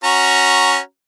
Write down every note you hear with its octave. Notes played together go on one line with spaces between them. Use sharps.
C#4 F#4 A#5